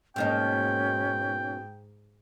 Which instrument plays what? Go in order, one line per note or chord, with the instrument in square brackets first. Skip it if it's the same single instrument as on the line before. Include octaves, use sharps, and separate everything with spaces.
[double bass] G#2 [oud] B2 A#3 D#4 [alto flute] C#4 [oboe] G5